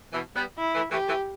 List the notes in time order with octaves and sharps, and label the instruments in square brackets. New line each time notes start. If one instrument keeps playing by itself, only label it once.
[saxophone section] B2 E3
G3 B3
[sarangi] E4
[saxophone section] E3 A3
[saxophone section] E3 A3 [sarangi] G4
[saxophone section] E3 A3